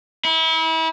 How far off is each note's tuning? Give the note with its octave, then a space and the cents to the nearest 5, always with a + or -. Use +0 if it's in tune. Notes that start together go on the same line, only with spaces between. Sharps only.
E4 -35